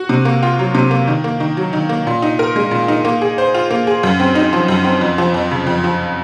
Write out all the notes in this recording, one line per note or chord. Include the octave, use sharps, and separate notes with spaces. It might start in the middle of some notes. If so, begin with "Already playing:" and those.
Already playing: F#4
C3
A#3
F4
F#3
C3
A#3
D#3
A#3
D#3
F#3
D#3
A#3
A#2
D#4
A#4
G#3
A#2
D#4
A#3
G#4
C5
F4
A#3
G#4
F#2
C4
D#4
F3
F#2
C4
F2
F3
F2
C#3
F2
F3